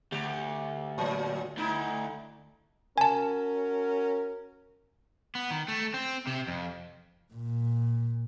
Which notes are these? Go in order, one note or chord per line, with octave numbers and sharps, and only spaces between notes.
D2 G4
A2 F#3
D2 D#4 E4
C#4 F#4 A#4 G#5 A5
B3
D#3
A3
C4
C3
F2
A#2